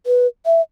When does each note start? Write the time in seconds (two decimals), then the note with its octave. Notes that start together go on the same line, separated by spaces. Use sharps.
0.06 B4
0.46 E5